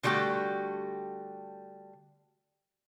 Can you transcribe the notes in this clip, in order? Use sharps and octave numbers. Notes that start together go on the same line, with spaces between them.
D3 G3 A3 F#4 G4